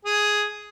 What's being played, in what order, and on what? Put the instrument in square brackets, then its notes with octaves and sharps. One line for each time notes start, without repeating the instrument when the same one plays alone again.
[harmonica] G#4